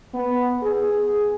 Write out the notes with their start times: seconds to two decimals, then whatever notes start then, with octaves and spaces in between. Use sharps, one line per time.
0.14 B3
0.62 G#4